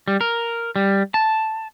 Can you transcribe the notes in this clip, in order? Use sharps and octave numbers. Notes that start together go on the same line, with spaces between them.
G3
A#4
G3
A5